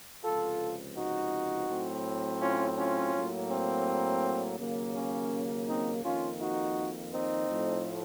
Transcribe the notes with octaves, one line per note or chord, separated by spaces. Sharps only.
C#2 C3 F3 F4 A4
D#4 F#4
A2 F#3 C4
C#4 F4
C#4 F4
A2 F#3 A#3
C4
D#2 C#3 F#3 A#3
C#4
C4 D#4
F2 D#3 A#3 C#4 F4
D#4 F#4
C4 D#4
A2 F3 A3